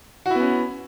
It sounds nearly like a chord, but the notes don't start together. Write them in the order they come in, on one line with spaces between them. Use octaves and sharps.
F#4 E4 B3 C#4